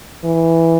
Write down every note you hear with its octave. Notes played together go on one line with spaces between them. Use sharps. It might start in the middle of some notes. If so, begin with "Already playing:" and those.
E3